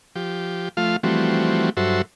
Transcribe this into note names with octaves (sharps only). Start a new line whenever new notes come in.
F3 G4
F3 A3 F4 F5
E3 F3 G3 A3 C4 F#4
G2 F#3 F#4 A4 C5 E5